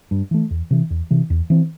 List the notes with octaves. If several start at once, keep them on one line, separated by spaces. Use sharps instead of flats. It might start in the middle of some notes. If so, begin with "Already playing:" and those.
G2
E3 A3
E2
C3 E3
E2
C3 E3
E2
E3 C4